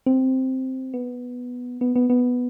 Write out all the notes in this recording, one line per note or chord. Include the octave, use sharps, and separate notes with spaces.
C4
B3
B3
B3
B3